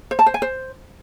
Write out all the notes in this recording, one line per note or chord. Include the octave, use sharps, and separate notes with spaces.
C5
A5
C5
G#5
C5